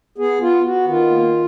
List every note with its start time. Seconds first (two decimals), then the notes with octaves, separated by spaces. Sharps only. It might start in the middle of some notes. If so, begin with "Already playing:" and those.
0.18 B3 G#4
0.41 B3 F4
0.64 B3 F#4
0.88 D#3 F4
1.10 A#3